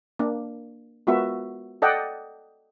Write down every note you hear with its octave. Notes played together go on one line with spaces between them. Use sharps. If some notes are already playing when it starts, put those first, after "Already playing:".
A#3 D4
G#3 B3 F4 F#4 A#4 E5
A4 D5 D#5 F#5 G5